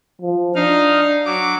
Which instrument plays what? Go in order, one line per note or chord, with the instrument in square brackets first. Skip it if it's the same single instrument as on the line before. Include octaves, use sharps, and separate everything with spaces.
[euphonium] F3
[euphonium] D4 [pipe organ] D#4 F5
[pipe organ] F#3 D6